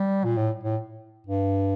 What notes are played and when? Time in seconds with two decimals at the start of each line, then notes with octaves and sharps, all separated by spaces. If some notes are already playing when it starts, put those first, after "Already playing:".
Already playing: G3
0.24 A#2
0.37 A2
0.64 A2
1.27 G2